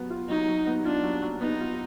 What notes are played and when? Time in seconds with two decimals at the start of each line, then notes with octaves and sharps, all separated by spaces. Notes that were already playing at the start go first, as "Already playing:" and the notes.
Already playing: F#3 B3
0.10 F4
0.29 F#3 D#4
0.48 F#3
0.66 B3
0.85 D4 F4
1.03 F#3
1.22 F#3
1.40 B3 D#4
1.60 F4